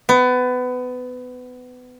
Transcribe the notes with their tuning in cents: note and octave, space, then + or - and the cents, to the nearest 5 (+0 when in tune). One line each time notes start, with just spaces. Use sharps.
B3 +25